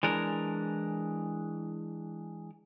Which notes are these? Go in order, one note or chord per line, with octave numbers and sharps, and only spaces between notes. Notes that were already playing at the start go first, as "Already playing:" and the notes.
E3 G#3 D4 A#4